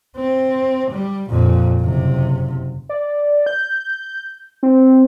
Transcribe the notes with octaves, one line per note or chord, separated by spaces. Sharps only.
C4
G3
F2 A#2
F#1 C3
D5
G6
C4